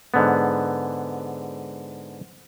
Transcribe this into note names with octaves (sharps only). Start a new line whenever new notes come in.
G#2 D3 B3